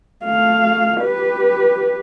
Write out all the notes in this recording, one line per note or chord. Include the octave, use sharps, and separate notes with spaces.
A3 F5
G4 B4